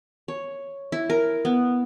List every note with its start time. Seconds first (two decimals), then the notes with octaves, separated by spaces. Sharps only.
0.28 C#5
0.92 E4
1.10 A#4
1.45 B3